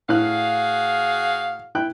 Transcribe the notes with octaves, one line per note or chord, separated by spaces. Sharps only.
A2 F#4 G#4 F5 F#6
E4 G5 F#6